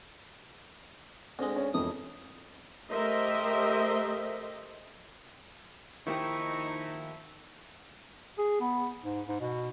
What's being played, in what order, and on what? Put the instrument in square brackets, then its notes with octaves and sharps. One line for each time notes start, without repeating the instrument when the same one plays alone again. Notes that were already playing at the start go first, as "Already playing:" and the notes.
[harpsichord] D2 G#3 [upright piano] C4
[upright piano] C#4
[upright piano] E1 F2 [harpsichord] D#6
[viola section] A3 G4 A#4 C5 D#5 E5
[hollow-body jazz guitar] D#3 A#3 G4 [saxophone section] F3 E4 [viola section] D#4 [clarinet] C#6
[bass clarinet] G#4
B3
G#2
G#2
B2